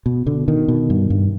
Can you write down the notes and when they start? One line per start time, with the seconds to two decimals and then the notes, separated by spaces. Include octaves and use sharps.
0.06 B2
0.26 B2 D3
0.48 B2 D#3
0.68 B2
0.90 G2
1.10 G2